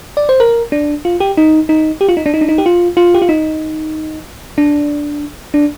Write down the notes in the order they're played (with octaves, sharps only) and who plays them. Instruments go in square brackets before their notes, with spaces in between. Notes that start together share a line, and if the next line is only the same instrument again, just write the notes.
[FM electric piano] D5
C5
A#4
D4
F4
G4
D#4
D#4
G4
F4
D#4
D4
D#4
D4
D#4
G4
F4
F4
G4
F4
D#4
D4
D4